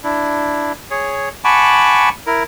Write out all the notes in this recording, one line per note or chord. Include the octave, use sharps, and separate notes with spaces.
D4 E4
G#4 C#5
F#5 G#5 A5 B5 C#6 D6
E4 A#4